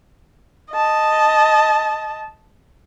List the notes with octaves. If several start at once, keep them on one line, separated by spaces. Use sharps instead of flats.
D#5 A5